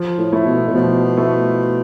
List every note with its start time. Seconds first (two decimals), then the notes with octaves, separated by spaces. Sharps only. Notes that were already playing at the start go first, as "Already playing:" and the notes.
Already playing: F3
0.18 A2
0.32 A3 E4
0.46 B2
0.68 A2
0.75 B2 F3
1.17 A3 E4